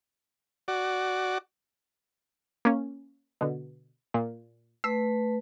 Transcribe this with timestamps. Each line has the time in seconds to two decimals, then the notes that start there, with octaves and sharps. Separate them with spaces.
0.68 F#4 D5
2.65 A#3 C#4
3.41 B2 D3
4.14 A#2
4.84 A3 B4 E6